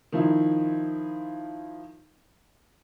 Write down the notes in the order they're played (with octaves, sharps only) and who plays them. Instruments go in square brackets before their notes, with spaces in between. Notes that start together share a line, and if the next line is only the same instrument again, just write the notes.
[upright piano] D#3 F3 E4